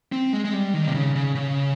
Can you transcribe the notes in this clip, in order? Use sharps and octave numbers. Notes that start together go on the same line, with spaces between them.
C4
G#3
G#3
G3
D#3
C3
C#3
C#3
C#3